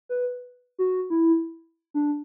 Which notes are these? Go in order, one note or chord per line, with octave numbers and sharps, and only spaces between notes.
B4
F#4
E4
D4